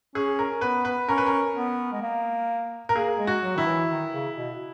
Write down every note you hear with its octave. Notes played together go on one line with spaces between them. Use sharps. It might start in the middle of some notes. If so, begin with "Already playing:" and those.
C#4 G#4
A#4
B3 B4
B4
C#4 A#4
B4
A#4
B3
G#3
A#3
A#4
A#3 G#4
G#3
F#4
F#3
D#3 E4
E3
D#3
C#3
B2